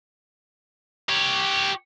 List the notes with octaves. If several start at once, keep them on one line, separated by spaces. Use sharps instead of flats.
G4 C#5